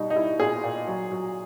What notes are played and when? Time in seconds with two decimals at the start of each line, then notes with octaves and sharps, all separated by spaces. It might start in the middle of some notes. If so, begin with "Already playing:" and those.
Already playing: B2 G3 D#4
0.10 D#4
0.16 G3 E4
0.40 A#2 G#4
0.63 A#2
0.87 F#3
1.12 F#3